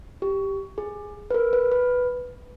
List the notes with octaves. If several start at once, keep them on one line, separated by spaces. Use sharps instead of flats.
G4
G#4
B4
A#4
B4
B4